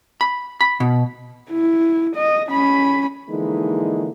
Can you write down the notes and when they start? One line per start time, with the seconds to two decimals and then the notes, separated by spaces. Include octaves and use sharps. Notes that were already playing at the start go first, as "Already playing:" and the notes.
0.21 B5
0.61 B5
0.80 B2
1.51 E4
2.16 D#5
2.50 C#4 B5
3.29 D3 E3 F3 G#3 A#3 D#4